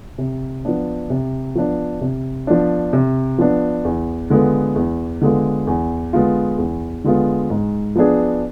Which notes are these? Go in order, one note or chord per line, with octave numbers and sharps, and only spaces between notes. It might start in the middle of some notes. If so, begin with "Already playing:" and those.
C3
F3 B3 D4
C3
F3 B3 D4
C3
F3 B3 D4
C3
F3 B3 D4
E2
D3 G#3 B3 F4
E2
D3 G#3 B3 F4
E2
D3 G#3 B3 F4
E2
D3 G#3 B3 F4
G#2
F3 B3 D4 G#4